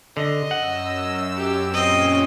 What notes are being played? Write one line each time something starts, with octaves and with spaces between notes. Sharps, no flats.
D3 D#5
F#2 F#5 E6
G4
A#2 C4 C#4 D#5